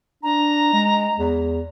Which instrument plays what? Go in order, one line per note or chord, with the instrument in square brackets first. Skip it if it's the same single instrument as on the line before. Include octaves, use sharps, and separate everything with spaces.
[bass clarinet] D4 [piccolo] A#5
[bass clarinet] G#3
E2